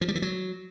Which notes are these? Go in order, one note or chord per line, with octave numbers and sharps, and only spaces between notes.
F3
G3
E3
F#3